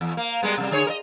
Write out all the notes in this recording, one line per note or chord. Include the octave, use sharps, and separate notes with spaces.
E2
A#3
G3 G#3 B3
C3 G3
D3 G#4 C#5
A#4 D#5